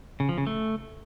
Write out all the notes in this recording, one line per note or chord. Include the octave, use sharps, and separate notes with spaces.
C#3
F3
C#3
A3